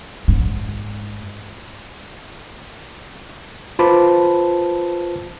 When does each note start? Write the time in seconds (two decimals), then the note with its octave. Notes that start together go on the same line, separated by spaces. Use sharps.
0.28 G#2
3.79 F4 B4 C5 A5 B5 D6